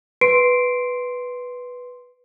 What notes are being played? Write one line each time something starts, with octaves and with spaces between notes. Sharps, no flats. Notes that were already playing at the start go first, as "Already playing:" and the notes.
B4 C6 C7 D7